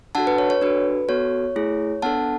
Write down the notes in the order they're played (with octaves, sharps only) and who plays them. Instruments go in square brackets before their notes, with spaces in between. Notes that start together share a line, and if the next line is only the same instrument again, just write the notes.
[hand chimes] D4 F#4 A4 F#5 A5
B4
C#5
C#5
D4 F#4 A4 B4
B3 F#4 A4 C#5
A3 E4 G#4
B3 D4 A4 F#5 A5